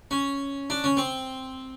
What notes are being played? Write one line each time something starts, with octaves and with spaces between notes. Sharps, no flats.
C#4
D4
C#4
C4